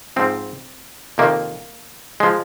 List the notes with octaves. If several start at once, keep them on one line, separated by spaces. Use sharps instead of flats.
G#2 F3 C4
F2 C3 D#3 A#3
F3 G#3